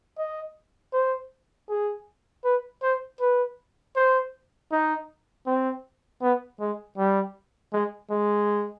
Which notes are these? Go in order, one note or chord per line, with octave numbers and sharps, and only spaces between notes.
D#5
C5
G#4
B4
C5
B4
C5
D#4
C4
B3
G#3
G3
G#3
G#3